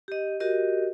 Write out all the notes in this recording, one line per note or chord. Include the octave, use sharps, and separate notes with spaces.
G4 D#5
F#4 G4 A#4 D#5